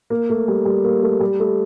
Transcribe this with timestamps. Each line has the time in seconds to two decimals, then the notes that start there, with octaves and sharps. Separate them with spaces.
0.10 A#3
0.30 A3
0.48 G3
0.65 G3
0.84 A#3
1.03 A3
1.20 G3
1.40 A3